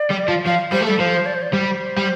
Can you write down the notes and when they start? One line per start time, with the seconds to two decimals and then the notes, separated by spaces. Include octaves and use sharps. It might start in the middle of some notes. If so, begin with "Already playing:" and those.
Already playing: D5
0.10 G3
0.28 F3
0.46 F3 F5
0.72 G3 C5
0.81 A3
0.86 G3 A4
0.99 F3 C5
1.26 D5
1.34 C5
1.42 D5
1.53 G3 C5
1.97 G3